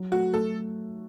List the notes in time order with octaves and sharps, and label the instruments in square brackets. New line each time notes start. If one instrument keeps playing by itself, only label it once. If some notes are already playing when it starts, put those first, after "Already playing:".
Already playing: [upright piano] F#3
[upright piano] A3 [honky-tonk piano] F#4
[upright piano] A3 [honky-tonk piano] A4